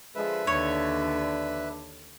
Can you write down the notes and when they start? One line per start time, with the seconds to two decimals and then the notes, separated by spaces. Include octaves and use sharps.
0.15 D3 F3 G#3 B4 E5
0.47 D#2 D3 D4 C#5